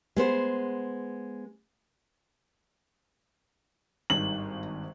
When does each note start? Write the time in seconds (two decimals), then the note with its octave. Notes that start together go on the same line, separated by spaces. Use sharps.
0.16 G#3 B3 C5
4.10 G#1 G2 D#3 F#7